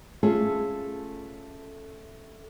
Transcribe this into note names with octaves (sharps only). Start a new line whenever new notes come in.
A3 C#4 F4 G#4 A4